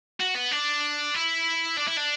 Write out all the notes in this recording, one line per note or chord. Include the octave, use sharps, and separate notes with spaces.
F#4
B3
D4
E4
D4
E4
D4